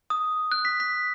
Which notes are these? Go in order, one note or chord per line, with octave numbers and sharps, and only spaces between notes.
D#6
F#6
B6
B6